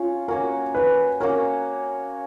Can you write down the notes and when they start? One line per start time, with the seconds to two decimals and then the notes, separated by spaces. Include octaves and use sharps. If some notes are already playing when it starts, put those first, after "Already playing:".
Already playing: C#4 F4 F5
0.28 A#3 C#4 F#4 A#4
0.75 B4
1.20 A#3 C#4 F#4 A#4 C#5